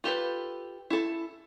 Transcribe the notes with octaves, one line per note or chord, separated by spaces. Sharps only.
F4 G4 A4 B4
E4 A4